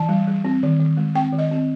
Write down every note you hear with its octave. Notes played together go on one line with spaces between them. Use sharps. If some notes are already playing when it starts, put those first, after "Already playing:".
Already playing: E3 A5
G3
G3
C4
D#3
D#3
G#3
C4 G5
D#3
D#5
C4